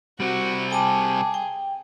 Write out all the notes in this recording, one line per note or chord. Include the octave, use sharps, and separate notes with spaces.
G3 C4 F#4
G#4 G5 A5 D6
G5